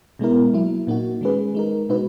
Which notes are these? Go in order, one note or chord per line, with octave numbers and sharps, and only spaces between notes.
B2 G#3 B3 E4 A#4
F#3 A#3 E4
A#2 A#3 D#4 F#4
D#3 G#3 C#4 G#4 B4
G#3 D#4 A#4
B2 G#3 D#4 F#4 B4